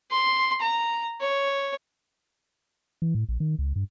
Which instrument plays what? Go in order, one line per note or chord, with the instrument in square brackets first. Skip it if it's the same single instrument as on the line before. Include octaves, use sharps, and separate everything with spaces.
[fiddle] C6
A#5
C#5
[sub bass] E3
A2
A#1
D#3
C#2
G2